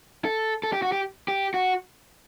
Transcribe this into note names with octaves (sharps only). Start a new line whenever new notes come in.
A4
A4
G4
F#4
G4
G4
F#4